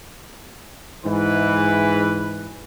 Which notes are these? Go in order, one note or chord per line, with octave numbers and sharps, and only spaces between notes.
G#2 E3 E4 B4